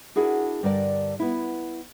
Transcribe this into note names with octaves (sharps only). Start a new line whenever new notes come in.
D4 E4 F#4 G#4 A#4
G2 D3 A#4 D5
B3 E4